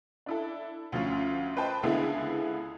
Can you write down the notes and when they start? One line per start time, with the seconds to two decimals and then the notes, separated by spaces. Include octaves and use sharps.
0.26 D4 E4 A4
0.92 D2 F3 C#4 F4
1.57 B4 C5 D#5 G5 A5
1.83 C#2 D3 B3 E4 G#4 A4